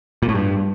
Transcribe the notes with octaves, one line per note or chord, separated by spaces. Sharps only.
A#2
A2
G2